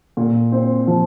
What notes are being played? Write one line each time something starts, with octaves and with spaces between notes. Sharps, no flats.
A#2
C4
F3